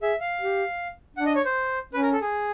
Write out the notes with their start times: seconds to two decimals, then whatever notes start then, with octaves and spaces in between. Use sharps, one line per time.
0.02 G#4 E5
0.21 F5
0.41 G4
1.16 D4 F#5
1.26 D#5
1.35 C#5
1.45 C5
1.93 C#4 B4
2.03 A#4
2.13 A4
2.21 G#4